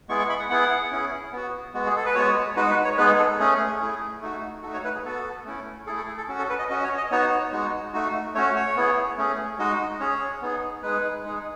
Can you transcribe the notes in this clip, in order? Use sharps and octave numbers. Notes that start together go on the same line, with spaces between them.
G#3 B3 E4 G#4 C#6
C#6
B5
F#5
B3 E4 G#4 F#5
C#4 E4 G#4
B3 F#4
G#3 B3 F#4
G#4
A4
B4
G#3 B3 F#4 C#5
G#3 D#4 F#4 B4
B4
C#5
G#3 B3 D#4 G#4 B4
A4
A3 C#4 G#4
A3 E4 G#4
A3 D#4 F#4
A3 D#4 F#4 A4
C#5
B4
G#4
B3 F#4 A4
A3 C#4 E4
A3 E4 G#4 A4
A4
G#4
A4
C#4 F#4
A4
B4
D#5
C#4 F#4 D#5
C#5
D#5
B3 D#4 F#4 C#5
C#5
G#3 D#4 F#4
A3 D#4 F#4
A3 C#4 F#4 C#5
C#5
B3 E4 G#4
A3 C#4 G#4
G#3 D#4 F#4 D#5
C#4 G#4 C#5
B3 D#4 G#4
G#3 D#4 G#4 B4
G#3 D#4 G#4